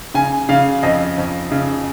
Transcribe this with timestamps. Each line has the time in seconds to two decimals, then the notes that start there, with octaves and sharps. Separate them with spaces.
0.14 C#3 G#5
0.49 C#3 F5
0.83 F2 D#5
1.18 F2
1.51 C#3